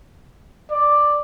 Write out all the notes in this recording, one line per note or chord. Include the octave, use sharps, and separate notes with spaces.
D5